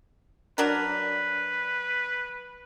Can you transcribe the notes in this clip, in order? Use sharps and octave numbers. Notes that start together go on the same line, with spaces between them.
F#3 D4 A#4 B4